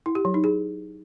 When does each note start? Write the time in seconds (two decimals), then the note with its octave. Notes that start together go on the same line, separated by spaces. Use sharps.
0.06 E4
0.15 G4
0.25 F#3
0.34 D#4
0.44 G#4